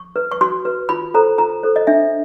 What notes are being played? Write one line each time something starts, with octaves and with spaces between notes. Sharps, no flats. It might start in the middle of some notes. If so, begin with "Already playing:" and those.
Already playing: C#6
B4
C#6
F#4 C6
B4
F4 B5
A4 C5 A#5
F4 A#5
A4 C5
D#5
D4 E5